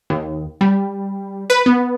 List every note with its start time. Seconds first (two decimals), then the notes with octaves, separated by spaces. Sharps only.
0.10 D#2
0.61 G3
1.50 B4
1.66 B3